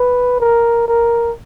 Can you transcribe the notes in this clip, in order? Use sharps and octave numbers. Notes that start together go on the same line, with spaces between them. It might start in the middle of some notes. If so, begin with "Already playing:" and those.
Already playing: B4
A#4
A#4